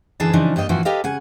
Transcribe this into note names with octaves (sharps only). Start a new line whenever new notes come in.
F#2 D3 E3 G#4 B4 A5
C#3 E3 F3 D4 D#4
G2 G3 A#3 D#5 G5
G2 A#2 E3 F3 E4 F#4
G4 A4 B4 D#5 F5
C#3 F#5 G#5